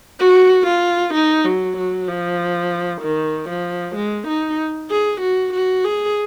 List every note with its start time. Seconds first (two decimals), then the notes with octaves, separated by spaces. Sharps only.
0.20 F#4
0.67 F4
1.14 D#4
1.45 F#3
1.77 F#3
2.08 F3
3.02 D#3
3.49 F3
3.95 G#3
4.27 D#4
4.91 G#4
5.21 F#4
5.53 F#4
5.85 G#4